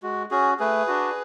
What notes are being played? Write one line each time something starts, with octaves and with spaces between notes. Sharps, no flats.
G#3 F#4
C#4 F#4 G#4
A3 G#4 B4
D4 F#4